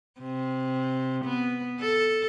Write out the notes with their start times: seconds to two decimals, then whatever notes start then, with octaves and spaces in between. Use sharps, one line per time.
0.20 C3
1.25 B3
1.80 A4